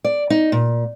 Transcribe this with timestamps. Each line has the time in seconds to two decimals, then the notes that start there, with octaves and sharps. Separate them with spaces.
0.04 D5
0.30 D#4
0.52 A#2